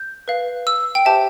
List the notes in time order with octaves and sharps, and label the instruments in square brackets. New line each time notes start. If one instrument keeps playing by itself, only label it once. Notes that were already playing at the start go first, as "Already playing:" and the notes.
Already playing: [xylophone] G6
B4 F5
E6
G5
G4 C5 E5 G5 A5